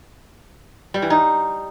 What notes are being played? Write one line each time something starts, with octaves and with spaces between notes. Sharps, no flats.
G3
E3
D#4